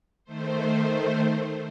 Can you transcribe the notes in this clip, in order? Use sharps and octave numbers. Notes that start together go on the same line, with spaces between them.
D#3 A3 C5